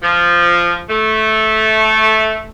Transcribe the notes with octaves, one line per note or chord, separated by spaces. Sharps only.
F3
A3